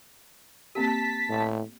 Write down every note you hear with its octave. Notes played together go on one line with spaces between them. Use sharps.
A#3 C4 G4 A5 B6
A2